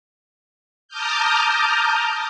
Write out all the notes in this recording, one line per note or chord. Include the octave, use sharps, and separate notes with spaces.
A5 A#5 D6 D#6 F6 G6